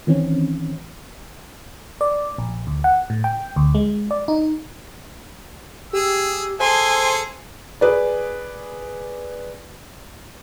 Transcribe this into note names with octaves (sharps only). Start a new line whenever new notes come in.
D#3 E3 C4 C#4
D5
A#1
D2
F#5
A2
G5
D2
G#3
D5
D#4
G4 G#4 E6
G#4 A4 C5 G#5 C6
G#4 B4 D5